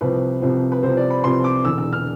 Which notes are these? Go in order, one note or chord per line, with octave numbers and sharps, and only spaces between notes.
C2 C3 F3 C4 B4
C2 C3 F3 C4
B4
C2 C3 F3 C4 C5
D5
B5
C2 C3 F3 C4 C6
D6
E1 E2 D3 E6
E6
F6